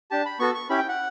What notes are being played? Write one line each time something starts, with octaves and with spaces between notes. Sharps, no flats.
D4 G4 A5
B5
B3 F#4 A4 C#6
C#6
C#4 E4 G4 B5
G5
F#5